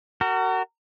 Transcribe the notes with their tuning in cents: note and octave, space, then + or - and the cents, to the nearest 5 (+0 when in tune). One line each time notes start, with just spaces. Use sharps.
F#4 +25 A#4 -35